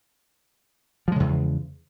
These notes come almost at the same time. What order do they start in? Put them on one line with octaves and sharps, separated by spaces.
F3 G#3 C#3 E2